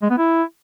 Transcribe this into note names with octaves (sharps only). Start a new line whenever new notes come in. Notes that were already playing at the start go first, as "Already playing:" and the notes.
G#3
B3
E4